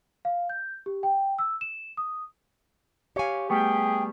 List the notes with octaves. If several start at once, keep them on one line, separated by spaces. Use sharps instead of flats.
F5
G6
G4
G5
E6
E7
D#6
G4 C#5 F5 G#5
G3 A3 B3 G#4 G5